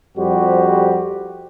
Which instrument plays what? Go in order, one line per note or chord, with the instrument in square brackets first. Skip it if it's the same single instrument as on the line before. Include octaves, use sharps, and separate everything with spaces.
[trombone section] F2 G3 F#4 G4 C5